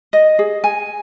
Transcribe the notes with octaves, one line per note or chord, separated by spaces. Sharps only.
D#5
G#4
G#5